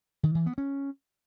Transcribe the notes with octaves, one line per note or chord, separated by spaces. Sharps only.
D#3
E3
B3
C#4